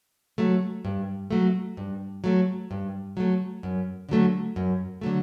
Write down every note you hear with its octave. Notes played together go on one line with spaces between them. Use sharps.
F#3 A3
G2
F#3 A3
G2
F#3 A3
G2
F#3 A3
F#2
D3 F#3 A3
F#2
D3 F#3 A3